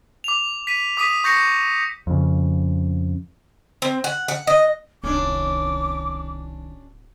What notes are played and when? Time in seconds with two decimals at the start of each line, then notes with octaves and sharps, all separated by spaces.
0.24 D6 F7
0.67 B6 D#7
0.97 D6 D#6 B6 D#7
1.24 C#6 G6 A#6 C7 C#7
2.07 F2 C#3
3.82 C4
4.04 F#5
4.28 F#5
4.47 D#5
5.04 D1 C2 D#3 C#4 D4 D6